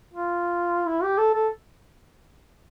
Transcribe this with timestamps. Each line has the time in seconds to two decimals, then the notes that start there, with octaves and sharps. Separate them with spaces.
0.13 F4
0.86 E4
1.03 G4
1.18 A4
1.34 A4